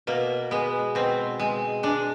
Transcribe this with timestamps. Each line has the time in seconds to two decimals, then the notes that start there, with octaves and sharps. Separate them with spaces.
0.07 B2 A#3
0.51 G#3 B3
0.95 B2 C4
1.39 G#3
1.83 G#3 D4